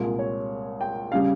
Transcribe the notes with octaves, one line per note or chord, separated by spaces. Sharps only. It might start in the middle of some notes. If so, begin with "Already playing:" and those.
Already playing: C2 A#2 G#3
C#5
G5
C#3 G3 F5